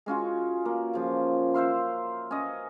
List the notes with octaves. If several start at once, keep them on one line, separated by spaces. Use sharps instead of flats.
G#3 C#4 F4 F#4
A#3
C#3 F3
C5 E5 F5 C6
C#4 D#5